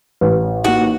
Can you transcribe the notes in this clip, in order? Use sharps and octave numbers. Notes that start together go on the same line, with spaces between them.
A1 B4
A#3 D#4 F#4